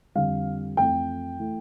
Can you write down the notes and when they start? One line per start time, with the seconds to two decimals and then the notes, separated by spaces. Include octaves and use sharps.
0.15 F2 D3 G3 F5
0.77 F2 E3 A3 G5
1.39 E3 A3